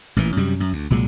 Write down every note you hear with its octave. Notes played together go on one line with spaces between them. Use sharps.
A1 A#2 D3 E3
F#2 C3 G3
F#2
D2
C2 A#2 F#3 G#3